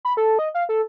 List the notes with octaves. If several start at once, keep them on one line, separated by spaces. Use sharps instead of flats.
B5
A4
D#5
F5
A4